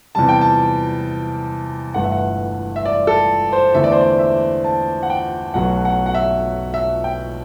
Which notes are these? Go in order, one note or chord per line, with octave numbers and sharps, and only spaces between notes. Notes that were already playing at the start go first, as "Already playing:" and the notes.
E2 C3 G3 A5
G5
A5
G1 G2 E3 A3 F#5
E5
F#5
E5
D5
A4
C5
E2 D3 A3 E5
D5
C5
D5
E5
A5
F#5
G5
B1 B2 F#3 A3 F#5
F#5
F#5
E5
E5
G5